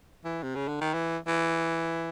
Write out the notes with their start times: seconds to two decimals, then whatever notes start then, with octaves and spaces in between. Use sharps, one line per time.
0.25 E3
0.43 C3
0.55 C#3
0.68 D3
0.81 D#3
0.94 E3
1.27 E3